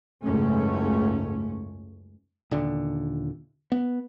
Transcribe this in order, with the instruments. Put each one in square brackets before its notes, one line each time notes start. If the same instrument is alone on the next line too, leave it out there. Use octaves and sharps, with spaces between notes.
[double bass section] F#1 C#2 G#2 A3 C#4
[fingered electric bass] D#1 D3
B3